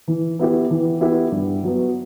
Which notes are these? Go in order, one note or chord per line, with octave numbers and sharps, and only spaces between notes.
E3
B3 E4 G4
E3
B3 E4 G4
G2
F#3 B3